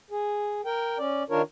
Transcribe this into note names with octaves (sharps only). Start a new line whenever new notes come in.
G#4
A#4 G5
C#4 D5
D#3 D4 F4 A#4 C#5